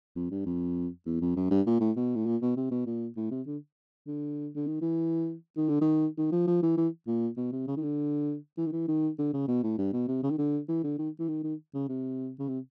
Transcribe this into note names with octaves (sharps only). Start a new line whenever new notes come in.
F2
G2
F2
E2
F2
F#2
G2
A#2
A2
B2
A2
A#2
B2
C3
B2
A#2
A2
C3
D3
D3
D3
D#3
E3
D#3
D3
D#3
D#3
F3
F3
E3
E3
A#2
B2
C3
C#3
D#3
D3
E3
D#3
E3
D#3
D3
C#3
B2
A2
G2
B2
C3
C#3
D#3
D3
E3
D3
D#3
E3
D#3
D#3
C#3
C3
C#3
C3